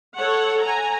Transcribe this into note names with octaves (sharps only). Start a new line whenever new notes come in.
A4 C#5 F#5
G#5 A#5